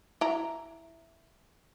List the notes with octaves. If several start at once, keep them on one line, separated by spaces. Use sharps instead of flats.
E4 A#5